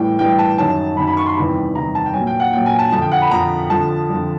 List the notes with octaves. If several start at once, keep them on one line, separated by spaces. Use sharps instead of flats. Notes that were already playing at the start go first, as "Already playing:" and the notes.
Already playing: A2 E3 G3 G5
A2 E3 G3 G5
A5
F#2 D#3 F#3 A5
F#2 D#3 F#3 B5
B5
C#6
C6
E2 C3 D#3 G3 B5
E2 C3 D#3 G3 A#5
A5
G5
A#2 F#3 G#5
G5
F#5
A#2 F#3 G5
G#5
A5
F2 D3 F3 A5
G5
F#5
B5
F2 D3 F3 A#5
F2 D3 F3 A5
F2 D3 F3